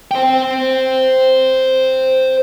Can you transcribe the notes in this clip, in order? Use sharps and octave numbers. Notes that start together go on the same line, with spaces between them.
C5 G5